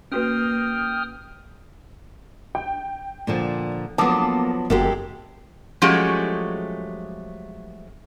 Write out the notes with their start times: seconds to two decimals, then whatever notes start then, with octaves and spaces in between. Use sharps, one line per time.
0.12 A#3 C#4 F#4 B4 G5 D#6 F6
2.55 G5
3.27 A#2 D3 F3
3.98 F3 F#3 A#3 B3 A4 A5 D6 D#6
4.70 F#1 F#2 G#3 A#3 F#4 G4 A4 A#4
5.82 F3 F#3 G#3 A3 C#4 G4